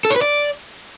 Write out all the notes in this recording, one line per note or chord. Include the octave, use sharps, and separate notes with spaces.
A4
C#5
B4
D5